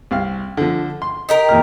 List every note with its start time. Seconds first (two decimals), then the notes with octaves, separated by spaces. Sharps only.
0.11 C2 F5
0.57 D3 F3
1.02 C6
1.29 D#4 G4 A#4
1.49 E2 A#2 F6